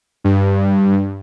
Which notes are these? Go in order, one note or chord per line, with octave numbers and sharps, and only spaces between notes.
G2